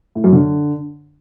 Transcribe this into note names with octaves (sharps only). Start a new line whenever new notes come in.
A2
F#2
D3